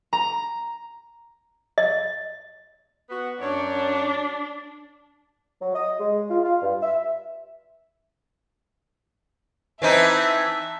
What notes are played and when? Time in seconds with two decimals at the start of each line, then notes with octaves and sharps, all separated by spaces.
0.13 A#5
1.78 D#5
3.10 B3 F#4
3.40 F#2 D4 C#5
5.61 F#3
5.75 D#5
6.00 G#3
6.30 F4
6.44 F4
6.63 G2
6.82 E5
9.82 E3 C4 D#4 E5 A5